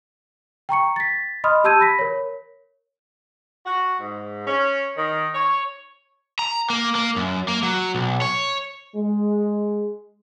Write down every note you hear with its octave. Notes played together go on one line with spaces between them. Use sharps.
G5 A#5 C#6 C#7
A6 B6
D#5 B5 C6 D#6 F6
G4 A5 E6 G6 G#6 D#7
B5 A#6 B6
A#4 C#5
F#4
G#2
C#4
D#3
C#5
A#5
A#3
A#3
F#2
A#3
F#3
B1
C#5
G#3